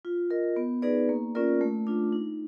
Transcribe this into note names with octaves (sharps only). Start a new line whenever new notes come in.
F4
A#4 D#5
B3
D#4 G#4 B4 D5
A#3
C#4 F4 A#4 D5
A3
D4 F4
D#4